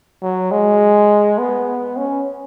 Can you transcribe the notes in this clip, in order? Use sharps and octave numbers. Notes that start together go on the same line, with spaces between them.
F#3
G#3
B3
C#4